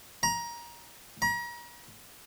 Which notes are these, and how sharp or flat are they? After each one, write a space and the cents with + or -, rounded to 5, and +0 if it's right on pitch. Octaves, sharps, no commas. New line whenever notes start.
A#5 +20
A#5 +40